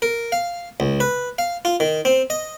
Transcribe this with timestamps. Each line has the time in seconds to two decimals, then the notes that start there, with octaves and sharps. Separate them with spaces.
0.02 A#4
0.32 F5
0.80 C#2
1.00 B4
1.38 F5
1.65 F4
1.80 D#3
2.05 C4
2.30 D#5